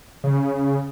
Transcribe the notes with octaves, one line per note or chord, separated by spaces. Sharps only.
C#3